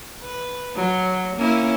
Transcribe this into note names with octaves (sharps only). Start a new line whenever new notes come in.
B4
F#3
A#3 C#4 E4